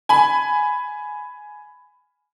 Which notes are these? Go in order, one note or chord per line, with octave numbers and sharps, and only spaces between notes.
G#5 B5